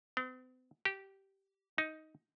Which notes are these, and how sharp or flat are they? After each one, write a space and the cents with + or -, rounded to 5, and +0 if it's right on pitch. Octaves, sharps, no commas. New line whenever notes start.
C4 -45
G4 -15
D#4 +10